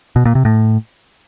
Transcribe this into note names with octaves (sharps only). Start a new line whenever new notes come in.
B2
A#2
C3
A2